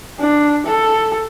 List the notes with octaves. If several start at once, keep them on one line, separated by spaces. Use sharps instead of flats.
D4
A4